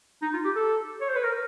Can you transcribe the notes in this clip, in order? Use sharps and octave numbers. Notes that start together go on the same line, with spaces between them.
D#4
F4
G4
A4
C#5
C5
B4
A#4